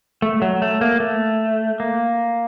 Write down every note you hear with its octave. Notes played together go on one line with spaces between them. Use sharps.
A3
F#3
A3
A#3
A3
A#3